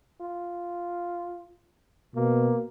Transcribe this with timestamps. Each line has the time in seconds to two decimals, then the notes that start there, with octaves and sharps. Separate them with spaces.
0.21 F4
2.16 B2 A#3